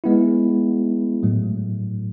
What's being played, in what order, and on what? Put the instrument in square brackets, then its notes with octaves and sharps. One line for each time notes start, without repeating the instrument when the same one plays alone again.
[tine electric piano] G#3 B3 E4
A2 F#3 A3